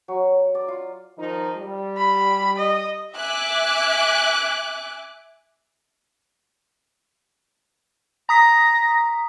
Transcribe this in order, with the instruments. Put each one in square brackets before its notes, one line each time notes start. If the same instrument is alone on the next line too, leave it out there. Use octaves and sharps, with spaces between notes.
[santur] F#3
D5
F4
[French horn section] D#3 F3 D#4
G3
[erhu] B5
D#5
[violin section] E5 G#5 D6 F#6
[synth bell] A#5 D#6 B6 [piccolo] A#6